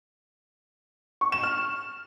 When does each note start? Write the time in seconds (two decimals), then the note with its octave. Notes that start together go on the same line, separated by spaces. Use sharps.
1.21 C#6
1.32 E7
1.43 F6